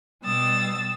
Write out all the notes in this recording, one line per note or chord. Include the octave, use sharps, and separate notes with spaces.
B2 G3 D#6 E6 A6